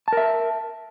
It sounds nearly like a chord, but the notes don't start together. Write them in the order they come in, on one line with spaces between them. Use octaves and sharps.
A5 A#4 E5